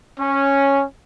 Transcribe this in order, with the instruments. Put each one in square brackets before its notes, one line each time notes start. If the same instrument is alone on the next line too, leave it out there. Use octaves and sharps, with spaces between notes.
[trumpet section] C#4